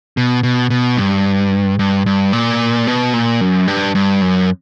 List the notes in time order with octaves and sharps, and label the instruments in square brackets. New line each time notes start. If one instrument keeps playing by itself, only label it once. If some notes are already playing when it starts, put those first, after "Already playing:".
[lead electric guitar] B2
B2
B2
G2
G2
G2
A#2
B2
A#2
F#2
G2
G2
F#2